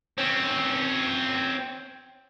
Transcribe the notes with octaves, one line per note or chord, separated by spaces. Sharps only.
C4 C#4